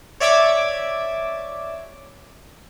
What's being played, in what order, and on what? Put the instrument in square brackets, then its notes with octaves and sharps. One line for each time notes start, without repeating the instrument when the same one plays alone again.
[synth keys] C#5 D5 E5 D6 E6 G#6